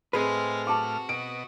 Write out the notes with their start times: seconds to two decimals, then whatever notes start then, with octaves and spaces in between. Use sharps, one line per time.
0.13 A2 G#3 C4 G#4 B4 F6
0.67 F#4 A5 D6
1.09 B2 D#5 D7